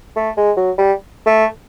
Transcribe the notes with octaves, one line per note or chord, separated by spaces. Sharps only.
A3
G#3
F#3
G3
A3